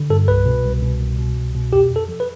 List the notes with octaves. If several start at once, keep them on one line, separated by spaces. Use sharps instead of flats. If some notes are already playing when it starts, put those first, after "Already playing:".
Already playing: D3
G2 A4
C2 B4
B2
C2
B2
C2
B2
C2
B2
F2 G4
F2
A4
F3
B4